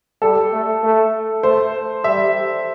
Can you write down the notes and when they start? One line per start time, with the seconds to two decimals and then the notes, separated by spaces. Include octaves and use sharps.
0.22 G3 A4
0.53 A3
0.83 A3
1.43 A3 C5
2.04 G3 E5